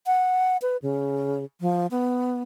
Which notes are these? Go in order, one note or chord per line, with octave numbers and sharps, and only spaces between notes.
F#5
B4
C#3
F3
B3